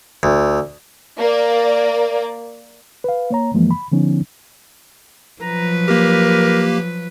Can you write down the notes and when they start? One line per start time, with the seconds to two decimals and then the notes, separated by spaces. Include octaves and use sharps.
0.23 D2
1.18 A#3 D5
3.04 B4 F5
3.30 A#3 C#5 A#5
3.54 F#2 E3 F3 G#3 A#3
3.71 B5
3.92 D3 F3 B3 C#4 D#4
5.42 F3 F#3 B4 A#5
5.88 A#3 G4 A#4